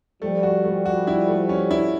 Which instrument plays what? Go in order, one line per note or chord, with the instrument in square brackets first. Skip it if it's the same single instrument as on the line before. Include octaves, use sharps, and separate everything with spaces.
[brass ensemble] F3 G3 [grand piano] A3
[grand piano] F#4
A3
F#4
E4
A3
C#4
E4